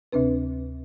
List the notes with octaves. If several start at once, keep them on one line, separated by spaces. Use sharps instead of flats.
D2 C3 C4 D4 B4